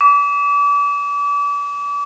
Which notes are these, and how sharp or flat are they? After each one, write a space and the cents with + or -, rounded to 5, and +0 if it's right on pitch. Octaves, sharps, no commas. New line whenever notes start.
D6 -35